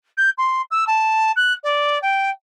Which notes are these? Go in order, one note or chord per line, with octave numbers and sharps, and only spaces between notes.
G6
C6
E6
A5
F#6
D5
G5